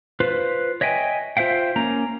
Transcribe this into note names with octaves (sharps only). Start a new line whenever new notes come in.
F4 B4 C5
C#5 D#5 E5 G5 G#5
F4 C5 E5 F5 G5
A#3 C#4 A#5